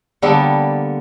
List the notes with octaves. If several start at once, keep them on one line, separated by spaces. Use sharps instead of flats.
D3 G3 A#3 B3 A4